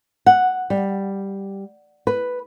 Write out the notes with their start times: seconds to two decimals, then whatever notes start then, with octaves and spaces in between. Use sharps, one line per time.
0.26 F#5
0.70 G3
2.07 B4